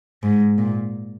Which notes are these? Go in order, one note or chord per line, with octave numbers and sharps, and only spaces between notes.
G#2
A#2